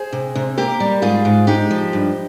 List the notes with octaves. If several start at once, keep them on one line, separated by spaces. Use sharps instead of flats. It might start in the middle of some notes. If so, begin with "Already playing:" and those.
Already playing: G#4 C5
C3
C3
A#3 G4 A#4
G3
G#2 F4 G#4
G#2
G#3 D#4 G4
F3
G2